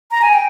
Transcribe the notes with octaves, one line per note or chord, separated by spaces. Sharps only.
A#5
G#5
G5